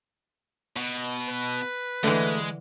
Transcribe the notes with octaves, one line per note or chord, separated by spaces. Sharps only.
B2
B4
D3 E3 G#3 A3